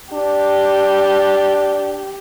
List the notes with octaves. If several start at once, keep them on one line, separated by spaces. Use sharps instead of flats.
D4 G4